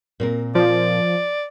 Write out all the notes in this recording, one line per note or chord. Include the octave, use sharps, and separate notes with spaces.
A#2 C4 A#4
F3 D5